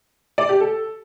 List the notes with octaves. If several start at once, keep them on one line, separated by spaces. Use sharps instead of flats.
D5
G4
A4